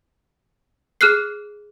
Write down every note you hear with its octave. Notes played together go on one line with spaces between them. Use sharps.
G#4 F6 F#6 C7